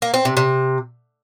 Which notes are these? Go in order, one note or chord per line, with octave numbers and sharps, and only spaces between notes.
A#3
C4
C3
C3